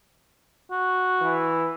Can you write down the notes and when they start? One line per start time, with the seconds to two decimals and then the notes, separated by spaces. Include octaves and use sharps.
0.71 F#4
1.21 E3